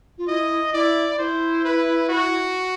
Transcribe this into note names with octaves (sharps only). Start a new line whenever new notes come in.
F4
E4 D#5
E4 D5
E4 C5
B4
F#4